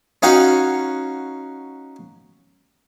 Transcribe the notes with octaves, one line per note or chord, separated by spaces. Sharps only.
C#4 D#4 F#4 F5 F#5